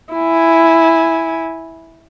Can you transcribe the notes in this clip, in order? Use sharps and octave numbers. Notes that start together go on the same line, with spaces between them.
E4 G#5